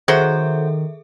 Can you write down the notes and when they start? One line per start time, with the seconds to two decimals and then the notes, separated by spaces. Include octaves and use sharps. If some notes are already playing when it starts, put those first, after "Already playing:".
0.08 D#3 F#3 F#4 G#4 A4 C5 E5